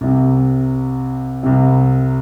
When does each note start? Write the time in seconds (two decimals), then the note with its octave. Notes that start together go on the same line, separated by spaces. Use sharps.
0.01 C2 C3
1.43 C2 C3